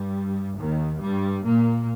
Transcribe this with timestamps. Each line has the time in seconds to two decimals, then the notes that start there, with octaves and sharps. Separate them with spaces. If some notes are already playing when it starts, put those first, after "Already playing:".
Already playing: G2 G3
0.57 D#2 D#3
1.01 G2 G3
1.45 A#2 A#3